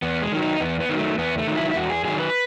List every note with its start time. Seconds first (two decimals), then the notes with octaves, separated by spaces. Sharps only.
0.02 E2 B3
0.22 G#3
0.32 D#3 F#3
0.42 D#4
0.60 E2 B3
0.80 B3
0.89 D#3 F#3
0.99 A3
1.18 E2 B3
1.38 A3
1.47 D#3 F#3
1.56 E4
1.71 E4
1.76 E2 F#4
1.90 G#4
2.05 D#3 F#3 G#4
2.19 B4